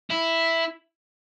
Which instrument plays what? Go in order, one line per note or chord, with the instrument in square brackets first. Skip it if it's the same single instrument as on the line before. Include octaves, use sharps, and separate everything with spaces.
[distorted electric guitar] E4